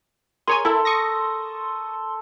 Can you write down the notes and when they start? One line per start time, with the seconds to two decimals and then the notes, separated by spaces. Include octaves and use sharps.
0.47 G#4 A#4 C#5 G#5 C6
0.65 E4 A4
0.85 C#6 D#6 A#6